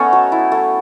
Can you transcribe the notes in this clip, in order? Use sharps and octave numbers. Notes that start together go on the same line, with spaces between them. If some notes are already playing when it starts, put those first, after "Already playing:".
Already playing: A3 B3 C#4 A4 C#5 D#5
F#3
E4
A3